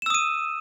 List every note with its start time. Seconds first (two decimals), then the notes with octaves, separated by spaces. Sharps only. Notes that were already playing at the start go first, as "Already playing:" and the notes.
0.02 E7
0.06 E6
0.10 D#6
0.14 D#7